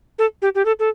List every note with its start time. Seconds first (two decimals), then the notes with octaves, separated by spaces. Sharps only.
0.18 A4
0.42 G4
0.55 G4
0.65 A4
0.79 A4